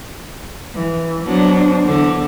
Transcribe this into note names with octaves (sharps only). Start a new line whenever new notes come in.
E3
F#3 B3 D4 C5
E2 D3